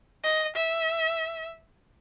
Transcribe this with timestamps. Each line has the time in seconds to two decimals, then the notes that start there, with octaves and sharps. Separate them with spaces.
0.24 D#5
0.56 E5